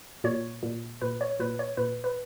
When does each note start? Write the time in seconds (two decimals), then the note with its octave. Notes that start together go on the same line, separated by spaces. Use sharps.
0.24 A#2 C#5
0.63 A#2
1.01 A#2 B4
1.21 C#5
1.40 A#2 B4
1.59 C#5
1.77 A#2 B4
2.04 B4